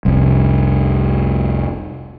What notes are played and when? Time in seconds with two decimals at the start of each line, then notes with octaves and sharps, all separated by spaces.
0.05 F1 C2